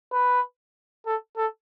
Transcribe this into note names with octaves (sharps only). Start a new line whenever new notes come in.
B4
A4
A4